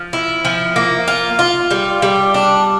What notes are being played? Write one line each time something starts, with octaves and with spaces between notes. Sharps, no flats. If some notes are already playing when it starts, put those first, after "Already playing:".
Already playing: F3
E4
F3
A#3
F4
F4
G3
G3
D4